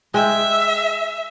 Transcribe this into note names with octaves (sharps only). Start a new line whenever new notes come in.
G#3 E5 G5